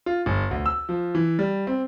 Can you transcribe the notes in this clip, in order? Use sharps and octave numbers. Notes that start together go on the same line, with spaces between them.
F4
G1
D2
E6
F3
E3
G3
C4